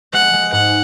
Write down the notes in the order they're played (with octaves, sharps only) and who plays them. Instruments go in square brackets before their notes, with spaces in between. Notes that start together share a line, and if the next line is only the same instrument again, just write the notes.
[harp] G#3 [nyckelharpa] F#5
[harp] G#3
[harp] G#2 [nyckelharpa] F#5